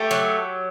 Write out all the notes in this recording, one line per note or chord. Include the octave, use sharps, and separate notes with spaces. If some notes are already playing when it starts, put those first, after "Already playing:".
Already playing: A3 G4
F#3